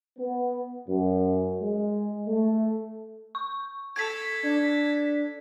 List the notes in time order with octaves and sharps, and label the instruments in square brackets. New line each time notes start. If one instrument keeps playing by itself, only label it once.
[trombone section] B3
F#2
G#3
A3
[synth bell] C#6
[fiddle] A4 [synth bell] G#6 B6
[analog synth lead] D4